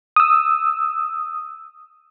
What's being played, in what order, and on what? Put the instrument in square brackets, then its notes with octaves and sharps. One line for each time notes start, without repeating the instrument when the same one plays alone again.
[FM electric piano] D#6 E6